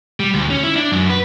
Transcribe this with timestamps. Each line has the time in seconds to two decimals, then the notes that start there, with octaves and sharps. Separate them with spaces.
0.20 G3
0.34 D2
0.50 C#4
0.63 E4
0.76 D4
0.92 F#2
1.10 B4